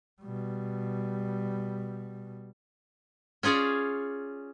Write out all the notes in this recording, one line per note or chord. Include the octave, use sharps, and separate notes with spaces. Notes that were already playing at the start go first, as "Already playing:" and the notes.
B2 G3
C#4 F4 G#4 C#5 D5